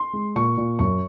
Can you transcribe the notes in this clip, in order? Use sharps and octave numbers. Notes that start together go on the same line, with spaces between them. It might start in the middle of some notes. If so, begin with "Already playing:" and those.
Already playing: C6
G#3
A#2 C#6
A#2
F#2 C#6